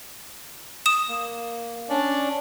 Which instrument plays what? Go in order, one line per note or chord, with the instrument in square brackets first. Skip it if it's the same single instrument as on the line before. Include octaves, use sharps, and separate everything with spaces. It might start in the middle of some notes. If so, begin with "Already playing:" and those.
[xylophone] D#6 E7
[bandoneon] A#3
C#4 D4 D5